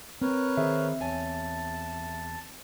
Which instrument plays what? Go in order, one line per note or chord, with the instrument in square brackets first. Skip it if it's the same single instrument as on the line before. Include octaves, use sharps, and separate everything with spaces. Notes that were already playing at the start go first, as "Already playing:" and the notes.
[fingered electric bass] C4 [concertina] A#4 B4 C#5
[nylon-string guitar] D#3 G#4 C5 [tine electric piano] E5
[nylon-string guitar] E2 C#5 G#5 [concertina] A5